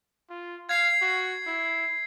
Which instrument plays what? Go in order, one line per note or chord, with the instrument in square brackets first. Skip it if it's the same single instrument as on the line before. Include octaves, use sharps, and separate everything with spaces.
[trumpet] F4
[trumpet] F5 [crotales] G#6 C7
[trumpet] F#4
E4